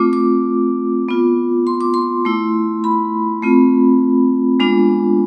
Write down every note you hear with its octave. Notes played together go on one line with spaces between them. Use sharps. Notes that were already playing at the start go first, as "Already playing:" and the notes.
Already playing: A3 C4 F4 D6
D6
B3 F4
C6
D6
C6
A3 E4
B5
A3 C4 F4
G#3 B3 D4 F4